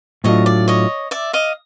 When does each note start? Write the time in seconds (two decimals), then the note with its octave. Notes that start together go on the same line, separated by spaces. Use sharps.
0.24 A2 F#3 A3 D4 F4 C#5 D#5
0.46 D5
0.68 C#5 D#5
1.11 D5 E5
1.33 D#5 F5